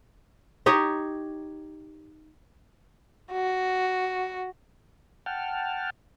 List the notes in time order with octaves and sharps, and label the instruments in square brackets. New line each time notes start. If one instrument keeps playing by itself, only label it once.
[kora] D#4 G4 C#5 D#5
[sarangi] F#4
[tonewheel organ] F#5 G5 A5 F6